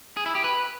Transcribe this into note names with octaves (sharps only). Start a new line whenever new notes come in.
G#4
E4
G4
B4